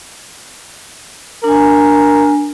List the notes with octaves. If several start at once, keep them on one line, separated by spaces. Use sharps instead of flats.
D4 A#4 G#5